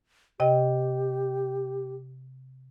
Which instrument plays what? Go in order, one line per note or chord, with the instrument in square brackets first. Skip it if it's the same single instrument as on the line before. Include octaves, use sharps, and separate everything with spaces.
[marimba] C3 D#5 G5 [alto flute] G4